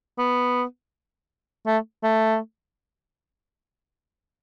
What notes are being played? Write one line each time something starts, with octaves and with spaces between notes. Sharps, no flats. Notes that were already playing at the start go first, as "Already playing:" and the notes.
B3
A3
A3